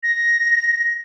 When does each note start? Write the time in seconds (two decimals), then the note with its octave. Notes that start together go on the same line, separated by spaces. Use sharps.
0.03 A#6